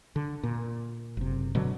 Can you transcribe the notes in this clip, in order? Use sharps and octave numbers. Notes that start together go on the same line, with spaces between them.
D3
A#2
F#1 C3
B2 D3 F#3